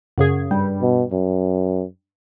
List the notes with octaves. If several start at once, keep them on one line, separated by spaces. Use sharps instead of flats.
F#2 C#3 G#4
G2 G3
B2
F#2